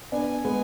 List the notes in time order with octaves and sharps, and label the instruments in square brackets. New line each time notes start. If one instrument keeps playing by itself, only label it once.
[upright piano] B3 D4 [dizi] G#5
[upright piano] G#3 B3